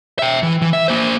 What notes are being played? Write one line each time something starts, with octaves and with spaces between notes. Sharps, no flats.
E5 G5
E3
E3
E5
A#3 C5